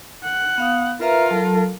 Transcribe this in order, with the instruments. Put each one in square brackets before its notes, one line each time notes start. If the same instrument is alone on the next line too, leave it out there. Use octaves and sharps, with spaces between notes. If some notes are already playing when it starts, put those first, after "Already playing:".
[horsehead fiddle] F#5
[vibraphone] B3 F5 D#6
[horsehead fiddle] F4 A#4 [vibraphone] B4 E5 A#5
[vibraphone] F#3 A4 A5